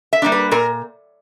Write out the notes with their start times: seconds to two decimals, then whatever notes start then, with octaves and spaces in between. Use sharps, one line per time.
0.13 E5
0.22 G3 A#3 D4
0.32 B4
0.52 A#2 A#4